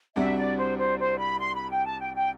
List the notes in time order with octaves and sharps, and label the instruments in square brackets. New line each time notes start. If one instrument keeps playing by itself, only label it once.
[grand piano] C2 C3 G3 D4 F#4 [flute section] E5
[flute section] D5
C5
C5
C5
B5
C6
B5
G5
A5
G5
G5